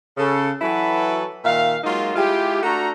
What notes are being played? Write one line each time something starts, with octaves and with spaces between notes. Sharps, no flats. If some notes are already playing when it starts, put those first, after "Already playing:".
C#3 A4
E3 F#3 E4 F#4 A4 B4
A#2 D#3 E5 F5
F#3 G#3 A#3 D#4 F4
G#3 E4 F4 G4
A3 D4 F#4 A4 A#5